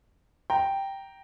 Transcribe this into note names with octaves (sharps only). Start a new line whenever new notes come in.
G5 A#5